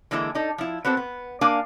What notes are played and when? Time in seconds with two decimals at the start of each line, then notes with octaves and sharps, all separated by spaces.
0.11 D3 E3 G#3 A#3 E4
0.35 D4 D#4 A4
0.58 F3 E4
0.85 B3 C4 F#4 A4 C5
0.97 B3
1.41 A#3 D4 A#4 F5 G#5